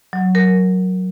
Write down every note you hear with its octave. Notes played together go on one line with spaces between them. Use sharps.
F#3
F#3 A#4